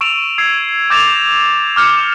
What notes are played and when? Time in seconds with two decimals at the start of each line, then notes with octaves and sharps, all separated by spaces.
0.01 C#6 E6 D7 E7 F7
0.38 E6 G#6 C7
0.90 D6 G6 A6 A#6 E7 F7
1.76 D6 F6 G6 C#7